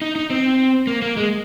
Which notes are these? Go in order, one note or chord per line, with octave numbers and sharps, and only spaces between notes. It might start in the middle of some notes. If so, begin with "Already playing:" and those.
D#4
D#4
C4
A#3
A#3
G#3